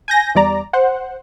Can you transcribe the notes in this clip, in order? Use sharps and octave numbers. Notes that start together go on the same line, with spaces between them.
G#5 G6 A#6
E2 G3 D5 A#5
C5 F#5